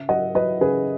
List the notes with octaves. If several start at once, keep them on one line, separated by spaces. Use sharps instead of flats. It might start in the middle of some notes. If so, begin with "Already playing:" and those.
Already playing: C#3 E5
F#3 D#5 F#5
F#3 B4 D#5
C#3 G#4 B4